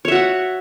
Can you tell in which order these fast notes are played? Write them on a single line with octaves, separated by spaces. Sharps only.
C#5 E5 F#4 F#5